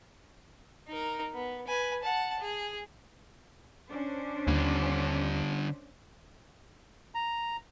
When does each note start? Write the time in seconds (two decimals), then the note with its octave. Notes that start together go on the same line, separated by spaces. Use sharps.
0.88 D#4 A#4
1.34 B3
1.67 B4 G#5
2.03 F#5 A5
2.40 G#4
3.88 C#4 D4 C5
4.47 D#2 D3 G3
7.15 A#5